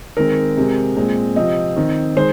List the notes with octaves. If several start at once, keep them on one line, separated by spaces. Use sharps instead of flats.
D#3 G#3 C4 A#4
C3 G#3 C4
A#2 G#3 C4
C3 F3 C4 D#5
D#3 C4
D#3 G#3 C5